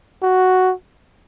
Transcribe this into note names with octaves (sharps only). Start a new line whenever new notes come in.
F#4